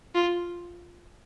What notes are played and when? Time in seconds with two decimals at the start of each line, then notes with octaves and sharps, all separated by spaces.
0.15 F4